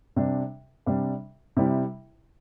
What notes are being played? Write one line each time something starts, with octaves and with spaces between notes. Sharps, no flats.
C3 G3 D4
C3 G3 D4
C3 G3 E4